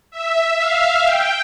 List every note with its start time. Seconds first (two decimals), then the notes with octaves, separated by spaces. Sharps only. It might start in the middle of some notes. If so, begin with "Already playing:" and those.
0.11 E5
0.58 F5
1.05 G5